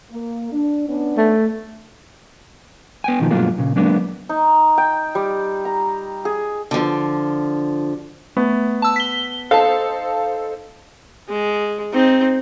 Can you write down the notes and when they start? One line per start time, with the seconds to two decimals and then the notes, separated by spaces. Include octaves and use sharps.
0.12 A#3
0.52 D4
0.88 B3 C#4 D4
1.18 A3
3.04 B3 G5 G#5
3.19 D#2 B2 D#3 F3
3.31 G2 B2 F#3 G#3 A#3 F4
3.58 A#2 C#3
3.76 F#3 G#3 A#3 B3 D4
4.29 D#4
4.78 G5
5.15 G3
5.65 A#5
6.25 G#4
6.71 D3 F3
8.37 A3 B3
8.82 A5 E6
8.96 B6 G7
9.51 D#4 A4 C5 F5 A5
11.29 G#3
11.93 C4 D#4